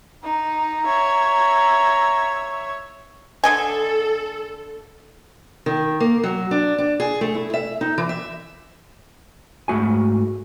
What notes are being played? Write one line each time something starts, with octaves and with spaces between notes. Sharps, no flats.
D#4 A#5
C#5 E5
D3 A4 D#5 G#5
D#3
A#3
F#3
D4
D4
G#4
A3
E4
E5
D#4
E3
E5
G#2 A3 F#4 G#5